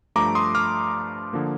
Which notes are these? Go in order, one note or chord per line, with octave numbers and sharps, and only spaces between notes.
G2 F3 A3 A#5 D6
C6 D#6
D6 F6
D3 F3 A#3